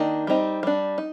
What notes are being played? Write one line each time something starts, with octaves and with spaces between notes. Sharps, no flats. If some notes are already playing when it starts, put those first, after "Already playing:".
Already playing: D#3 A#3 D4 D#4
G3 C4 D#4
G3 D4
D#4